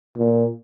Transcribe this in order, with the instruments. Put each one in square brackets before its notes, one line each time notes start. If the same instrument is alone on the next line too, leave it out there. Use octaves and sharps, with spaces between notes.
[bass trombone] A#2